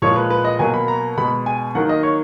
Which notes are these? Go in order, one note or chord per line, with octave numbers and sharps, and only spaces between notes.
A#2 F3 G#3 C#5
B4
B4
D#5
B2 F#3 A#3 G#5
B5
A#5
B2 G#3 B5
G#5
D#3 F#3 A#3 F#5
D#5
C#5